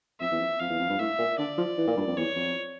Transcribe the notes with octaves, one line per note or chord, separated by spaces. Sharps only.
F2 E5
E2
F2
F2 F5
E2
F2
G2
A2 E5
A#2
D3 D5
F3
E3
A#2
G2
F2
E2 C#5
F2